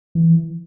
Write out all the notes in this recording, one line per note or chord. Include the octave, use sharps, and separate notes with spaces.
E3